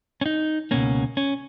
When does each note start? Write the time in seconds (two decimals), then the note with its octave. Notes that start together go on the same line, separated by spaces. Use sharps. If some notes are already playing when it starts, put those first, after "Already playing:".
0.21 C#4
0.26 D#4
0.71 C#2 B2 A#3 C#4
1.17 C#4